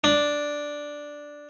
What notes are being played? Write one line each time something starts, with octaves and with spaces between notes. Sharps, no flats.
D4